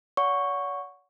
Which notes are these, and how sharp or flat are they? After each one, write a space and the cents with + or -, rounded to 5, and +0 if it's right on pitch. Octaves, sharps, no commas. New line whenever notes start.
C#5 +45 F#5 -15 C#6 +0